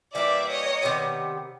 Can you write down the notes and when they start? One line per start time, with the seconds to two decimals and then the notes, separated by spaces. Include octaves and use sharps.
0.14 E3 G3 A#3 D5 E5
0.49 C#5 D#5
0.82 C3 D#3 G3 B3